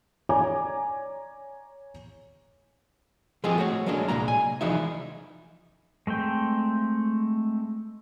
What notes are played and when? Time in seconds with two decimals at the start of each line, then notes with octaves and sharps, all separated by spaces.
0.29 C#5 D5 G#5 A#5 D6
3.44 F3 G#3 C4 F4 G4 G#4
3.58 A3 F#4 C#5
3.86 F#3 G#3 A#3 C#4 D4
4.08 C2 A#2 G#3 A#5
4.28 G#5
4.61 C2 E3 F3 G#3 D#4 E5
6.07 G#3 A3 C4 G5